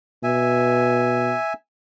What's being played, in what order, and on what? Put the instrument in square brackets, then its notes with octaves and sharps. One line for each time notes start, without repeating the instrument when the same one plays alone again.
[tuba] B2 [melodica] E5 G#5